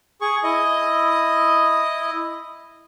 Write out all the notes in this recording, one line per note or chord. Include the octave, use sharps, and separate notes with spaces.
G#4 C#6
E4 D#5